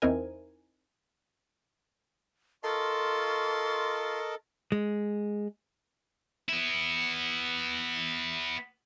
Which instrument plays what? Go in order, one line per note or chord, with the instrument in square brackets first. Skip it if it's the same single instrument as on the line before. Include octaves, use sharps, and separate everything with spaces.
[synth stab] E2 C4 D#4 E4 A#4 G#5
[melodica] F4 C6 [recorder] A4 [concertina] A#4 D#5 A5 [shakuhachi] C#6
[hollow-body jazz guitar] G#3
[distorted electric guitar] B3 E4